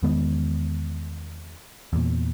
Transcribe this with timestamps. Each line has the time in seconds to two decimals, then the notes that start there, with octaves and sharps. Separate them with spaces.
0.03 E2 D#3 G#3 B3
1.93 E2 A#2